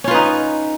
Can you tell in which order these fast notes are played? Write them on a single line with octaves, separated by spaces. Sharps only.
C#4 F4 B4 D#4